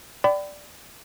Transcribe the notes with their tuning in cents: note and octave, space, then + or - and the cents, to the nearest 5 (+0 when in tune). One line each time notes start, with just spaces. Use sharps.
D5 +0 G5 -25 B5 +30